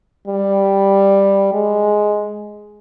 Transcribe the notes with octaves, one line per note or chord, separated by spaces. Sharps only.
G3
G#3